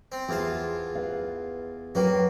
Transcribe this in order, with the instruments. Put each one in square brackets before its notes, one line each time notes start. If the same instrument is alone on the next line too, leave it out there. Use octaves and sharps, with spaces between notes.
[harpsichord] C4
[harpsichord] E2 F4 A5 [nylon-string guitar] G#4
[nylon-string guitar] B4 F5
[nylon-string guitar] F#3 B4 G5 [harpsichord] A#3 F#4